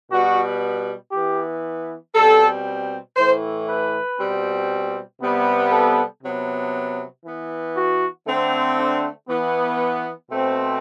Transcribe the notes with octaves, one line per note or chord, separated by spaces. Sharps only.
B2 G3 B3 F#4
E3 B3 G4
B2 G3 C4 A4
A2 E3 A3 C5
B4
B2 G3 C4
C3 G3 B3
A4
C3 F#3 B3
E3 B3
F#4
D3 A3 C4
D4
E3 B3
B2 A3 C4